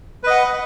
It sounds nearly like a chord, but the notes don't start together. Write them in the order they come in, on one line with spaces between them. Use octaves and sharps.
B4 D#5 F#5